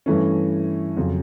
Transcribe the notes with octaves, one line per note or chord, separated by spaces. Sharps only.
G2 E3 A3 C#4
F2 C#3 F#3